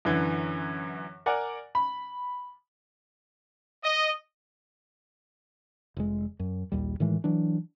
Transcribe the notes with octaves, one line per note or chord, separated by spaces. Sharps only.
F#2 D3 E3
A#4 D5 F#5 G#5
B5
D#5
F1 G#3
F#2
A#1 D#2 G3
A2 D#3 E3 G#3
E3 F#3 D4